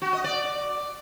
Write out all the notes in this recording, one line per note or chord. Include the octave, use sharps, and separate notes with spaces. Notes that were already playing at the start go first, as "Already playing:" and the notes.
F#4
D#5
D5